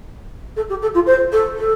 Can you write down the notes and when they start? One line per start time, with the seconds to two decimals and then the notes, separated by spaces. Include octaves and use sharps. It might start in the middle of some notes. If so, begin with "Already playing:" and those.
0.56 A4
0.69 G4
0.82 A4
0.95 F4
1.06 C5
1.32 A4
1.58 A4